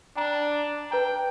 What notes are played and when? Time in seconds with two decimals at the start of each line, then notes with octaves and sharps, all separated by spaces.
0.16 D4 G5 A#5
0.91 B4 G5 A#5